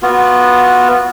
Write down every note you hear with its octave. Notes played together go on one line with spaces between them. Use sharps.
B3 F4 F#4